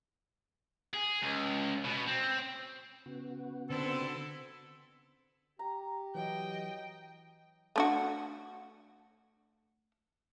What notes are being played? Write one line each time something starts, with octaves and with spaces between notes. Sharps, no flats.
G#4
C#2
B2
C4
C#3 B3 F#4
D3 C4 E4 A4
G4 A#5
E3 F#3 D#5 G5
A3 D4 F#4